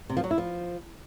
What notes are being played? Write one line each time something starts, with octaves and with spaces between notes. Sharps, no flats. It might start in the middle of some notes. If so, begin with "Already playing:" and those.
C3
F3
F#3
E4
F3